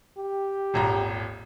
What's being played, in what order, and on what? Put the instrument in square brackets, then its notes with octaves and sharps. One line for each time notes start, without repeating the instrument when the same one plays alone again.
[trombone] G4
[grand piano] D#1 G#1 A#5